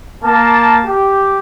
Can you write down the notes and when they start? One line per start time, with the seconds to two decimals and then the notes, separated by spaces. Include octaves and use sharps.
0.24 A#3 A5
0.86 G4